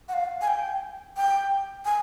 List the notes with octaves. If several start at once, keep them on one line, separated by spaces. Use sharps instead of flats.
F#5
F5
G#5
G5
G5
G#5